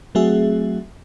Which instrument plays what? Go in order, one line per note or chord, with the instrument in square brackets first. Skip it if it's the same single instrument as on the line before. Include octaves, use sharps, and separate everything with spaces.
[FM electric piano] F#3 A3 C4 F#4 G#4 E5